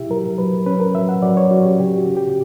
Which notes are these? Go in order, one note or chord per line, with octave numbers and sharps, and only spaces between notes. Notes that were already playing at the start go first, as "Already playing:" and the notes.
Already playing: B2 E4 G4 E5
F#3 A#4
F#3 B4
C#4 B4
A#4
F#3 E5
F#5
F#3 D5
C#5
C#4 F#4
G4
C#3 G4
F#4
C#3
G4